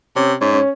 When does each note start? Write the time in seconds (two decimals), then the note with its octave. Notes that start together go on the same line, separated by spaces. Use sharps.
0.16 C3 C#4
0.41 G#2 C#4
0.53 C#4